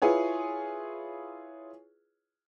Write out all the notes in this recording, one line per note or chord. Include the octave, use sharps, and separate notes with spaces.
E4 F4 G#4 B4 C#5